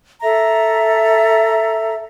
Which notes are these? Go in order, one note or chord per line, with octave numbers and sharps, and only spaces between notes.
A4 E5 A#5